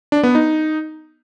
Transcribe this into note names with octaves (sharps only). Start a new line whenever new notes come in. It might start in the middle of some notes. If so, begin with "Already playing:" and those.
D4
B3
D#4